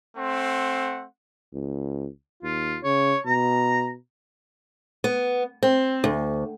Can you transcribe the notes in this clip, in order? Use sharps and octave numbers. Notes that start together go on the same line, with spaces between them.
A3 C4 F#5 C6
C#2
D#2 F4
C#3 C#5
B2 A#5
B3
C4
D2